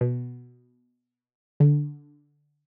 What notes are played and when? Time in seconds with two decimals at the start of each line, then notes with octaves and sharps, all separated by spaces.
0.01 B2
1.60 D3